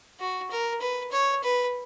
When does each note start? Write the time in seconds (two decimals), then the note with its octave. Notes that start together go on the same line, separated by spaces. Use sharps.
0.20 F#4
0.51 A#4
0.81 B4
1.12 C#5
1.44 B4